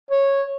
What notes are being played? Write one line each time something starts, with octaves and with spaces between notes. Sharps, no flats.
C#5